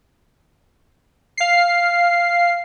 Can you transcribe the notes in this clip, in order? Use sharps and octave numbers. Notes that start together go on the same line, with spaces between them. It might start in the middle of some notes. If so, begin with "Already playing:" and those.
F5 C7